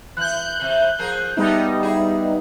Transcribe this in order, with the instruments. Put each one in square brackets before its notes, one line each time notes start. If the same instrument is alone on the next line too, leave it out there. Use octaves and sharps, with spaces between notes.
[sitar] E3 [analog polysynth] F#6 G6
[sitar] C3 E3
F3 G#4 A#4
[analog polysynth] G3 B3 D#4 [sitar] A3
[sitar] E4 G#4